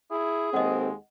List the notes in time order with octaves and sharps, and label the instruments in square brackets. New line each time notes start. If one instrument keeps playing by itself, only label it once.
[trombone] E4 [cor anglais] G#4
[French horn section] D#2 C4 A4 [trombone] G#3 [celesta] D#5 F#5